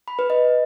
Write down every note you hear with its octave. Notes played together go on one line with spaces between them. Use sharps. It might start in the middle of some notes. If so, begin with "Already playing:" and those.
B5
B4
D#5